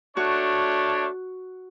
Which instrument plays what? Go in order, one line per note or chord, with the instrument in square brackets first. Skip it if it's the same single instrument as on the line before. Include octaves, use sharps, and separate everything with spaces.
[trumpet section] A3 D4 C#5 [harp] F#4